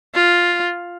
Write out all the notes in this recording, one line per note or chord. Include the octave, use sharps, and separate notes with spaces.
F4